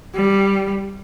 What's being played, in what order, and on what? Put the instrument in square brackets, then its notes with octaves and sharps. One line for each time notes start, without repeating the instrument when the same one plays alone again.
[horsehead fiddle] G3